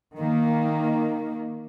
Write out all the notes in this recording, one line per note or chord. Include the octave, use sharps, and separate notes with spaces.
D#3 A#3